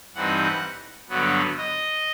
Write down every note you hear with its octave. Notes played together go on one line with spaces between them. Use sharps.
G2 E3 G3 C4 D#4 F#5
G2 D3 F#3 B3
D#5